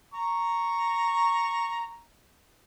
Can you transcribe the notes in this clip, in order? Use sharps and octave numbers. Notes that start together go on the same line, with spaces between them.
A#5 C#6